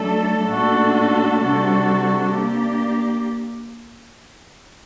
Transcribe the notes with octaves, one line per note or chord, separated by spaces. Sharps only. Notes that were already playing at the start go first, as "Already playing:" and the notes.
Already playing: F#3 A3 D4 A4
A#2 A3 D4 F#4 A4
C3 G3 D4 F#4 A4
A#3 D4 G4